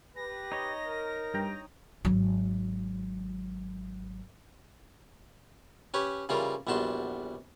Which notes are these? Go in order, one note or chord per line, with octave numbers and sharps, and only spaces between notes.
G4 B4 A#6
D#4 C#5 D#5
A#4
G2 G5 A#5
G#1 F#3
C#4 G4 B4 C#5
C#3 E3 G3 A#3 F4 A#4
A#1 E2 G3 F#4 A5 C6